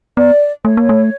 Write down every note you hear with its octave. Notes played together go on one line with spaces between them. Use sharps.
B3 D5
A3 C#5
A#3
A3